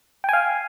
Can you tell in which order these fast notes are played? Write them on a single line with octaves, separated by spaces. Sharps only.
G5 G#5 F5